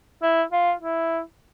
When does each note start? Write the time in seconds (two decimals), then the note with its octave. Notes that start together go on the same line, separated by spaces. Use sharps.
0.23 E4
0.52 F4
0.80 E4